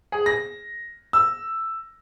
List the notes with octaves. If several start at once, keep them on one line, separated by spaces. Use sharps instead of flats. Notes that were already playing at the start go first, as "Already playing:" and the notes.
G#4
A#6
E6